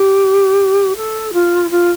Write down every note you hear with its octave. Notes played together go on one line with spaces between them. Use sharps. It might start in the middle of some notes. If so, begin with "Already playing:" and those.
Already playing: G4
A4
F4
F4